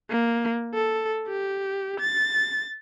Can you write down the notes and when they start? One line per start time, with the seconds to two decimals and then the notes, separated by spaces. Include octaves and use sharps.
0.10 A#3
0.74 A4
1.28 G4
2.00 A6